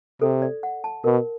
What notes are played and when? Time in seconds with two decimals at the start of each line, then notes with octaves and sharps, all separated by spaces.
0.21 C3 A4
0.42 D5
0.63 F#5
0.84 A5
1.04 B2 A#4